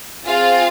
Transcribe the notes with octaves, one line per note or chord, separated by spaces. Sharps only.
C4 F4 G#4 F5